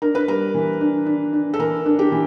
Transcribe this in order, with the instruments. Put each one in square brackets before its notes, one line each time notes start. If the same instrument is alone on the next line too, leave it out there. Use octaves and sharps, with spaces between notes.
[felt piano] D4 A#4
B4
G3 A#4
E3
D4
D4
D4
A4
E3 A#4
D4
G4
E3